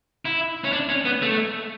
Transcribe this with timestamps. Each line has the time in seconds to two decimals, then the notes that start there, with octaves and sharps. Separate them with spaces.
0.25 E4
0.64 C#4
0.73 D4
0.89 C#4
1.05 B3
1.22 A3